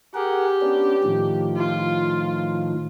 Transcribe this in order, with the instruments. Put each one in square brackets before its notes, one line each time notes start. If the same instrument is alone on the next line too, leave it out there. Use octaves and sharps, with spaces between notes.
[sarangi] G4 [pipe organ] G#4 A#4 F#5
[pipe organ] B3 C#4 D4
A2 D#3 F3
[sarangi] F4